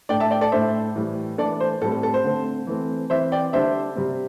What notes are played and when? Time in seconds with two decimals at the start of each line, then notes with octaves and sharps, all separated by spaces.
0.09 A2 A3 D4 D5 G5
0.20 E5 A5
0.31 D5 G5
0.41 A4 D5
0.52 A2 A3 D4 C5 E5
0.95 A2 E3 G3
1.38 E3 A3 D4 A4 D5
1.60 C5
1.82 A2 A4
1.84 G3 C4
1.92 A4
2.03 A4
2.14 C5
2.24 D3 A3 C4
2.67 E3 A3 C4
3.10 E3 C4 C5 E5
3.32 D5 G5
3.53 D3 G3 D4 C5 E5
3.95 C3 G3 C4